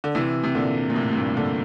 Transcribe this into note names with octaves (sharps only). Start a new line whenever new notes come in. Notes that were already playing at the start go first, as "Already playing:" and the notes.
D3
C3 E3
C3
A#2 D3
A#2
A2 C3
C3
G2 A#2
A#2 D3